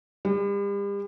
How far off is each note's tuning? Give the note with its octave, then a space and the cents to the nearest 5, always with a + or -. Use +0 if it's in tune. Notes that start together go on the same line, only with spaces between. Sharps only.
G3 +40